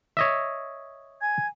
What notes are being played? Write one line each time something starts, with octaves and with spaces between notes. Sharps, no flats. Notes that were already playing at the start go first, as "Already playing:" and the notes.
C#5 D#5 E5
G#5 G#6